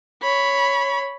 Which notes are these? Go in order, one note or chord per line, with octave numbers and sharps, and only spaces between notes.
C#5 B5